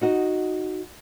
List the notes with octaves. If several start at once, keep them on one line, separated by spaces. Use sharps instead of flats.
D#4 F#4 D#5